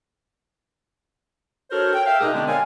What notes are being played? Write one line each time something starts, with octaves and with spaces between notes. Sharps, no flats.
D4 F#4 A4 A#4 C5 C#5
G5
E5 F5 G5
B2 G#3 D#4 G4 G#4 A#4
D3 G#3 B3 C4 D4
A#4 C#5 D5 F5 G#5